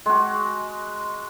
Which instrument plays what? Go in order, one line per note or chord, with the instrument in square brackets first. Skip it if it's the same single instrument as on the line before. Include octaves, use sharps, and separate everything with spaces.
[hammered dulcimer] G#3 F#4